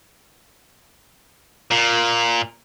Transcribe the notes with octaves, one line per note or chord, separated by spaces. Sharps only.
A#2